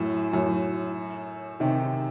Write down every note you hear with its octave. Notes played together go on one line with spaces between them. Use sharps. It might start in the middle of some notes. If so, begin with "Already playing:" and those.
Already playing: F#2 A2
F#2 A2
C3 D#3